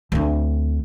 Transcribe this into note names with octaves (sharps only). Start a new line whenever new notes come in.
D2 C4